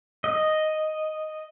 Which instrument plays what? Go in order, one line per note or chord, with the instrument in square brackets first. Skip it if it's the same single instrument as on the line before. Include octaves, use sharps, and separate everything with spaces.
[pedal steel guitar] D#5